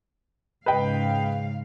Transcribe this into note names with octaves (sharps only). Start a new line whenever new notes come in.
G#2 C#3 B4 D#5 F5 G5